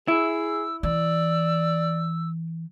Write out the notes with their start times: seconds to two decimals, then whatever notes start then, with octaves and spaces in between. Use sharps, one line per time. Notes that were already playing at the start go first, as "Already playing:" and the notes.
0.08 E4 G#4 E6
0.83 E3 D5 E6